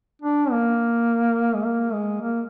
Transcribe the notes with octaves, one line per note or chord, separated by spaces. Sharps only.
D4
A#3
G#3
A#3
G#3
A#3